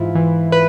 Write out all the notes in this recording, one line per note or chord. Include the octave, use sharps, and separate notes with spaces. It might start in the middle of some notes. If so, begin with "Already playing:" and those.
Already playing: G#2 E3 E4 F4
E3
B4